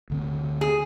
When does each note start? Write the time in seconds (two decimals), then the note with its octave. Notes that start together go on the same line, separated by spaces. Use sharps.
0.10 D2 D3 C4
0.61 G#4